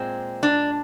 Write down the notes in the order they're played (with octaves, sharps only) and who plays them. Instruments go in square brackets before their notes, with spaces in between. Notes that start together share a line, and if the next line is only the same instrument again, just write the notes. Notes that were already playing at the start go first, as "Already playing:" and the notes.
Already playing: [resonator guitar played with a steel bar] A#2 G#3 C4
D4